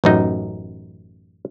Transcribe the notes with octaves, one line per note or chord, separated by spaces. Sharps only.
A1 F#2 D#4